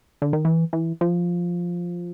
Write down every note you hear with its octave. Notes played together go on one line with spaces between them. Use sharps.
D3
D#3
E3
E3
F3